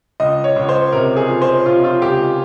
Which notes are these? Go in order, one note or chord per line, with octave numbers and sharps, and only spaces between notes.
C#2 D#5
C#5
C#2
C5
C3 A#4
G#4
F3
C5
C3 F4
F4
C#2 G4